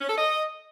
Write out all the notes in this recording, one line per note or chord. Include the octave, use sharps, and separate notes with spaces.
C#4
A4
D#5